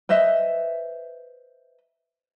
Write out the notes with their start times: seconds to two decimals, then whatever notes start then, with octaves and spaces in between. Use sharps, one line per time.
0.09 B4 C5 D#5 E5